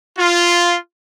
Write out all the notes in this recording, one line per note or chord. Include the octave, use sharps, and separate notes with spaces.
F4